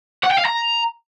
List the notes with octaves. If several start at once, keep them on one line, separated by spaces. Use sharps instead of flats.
F#5
G5
F5
A#5